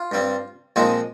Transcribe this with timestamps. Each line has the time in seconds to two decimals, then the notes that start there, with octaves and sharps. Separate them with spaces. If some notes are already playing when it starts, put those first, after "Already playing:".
Already playing: F4
0.12 G2 G3 C4
0.76 A#2 F3 G#3 C4 D#4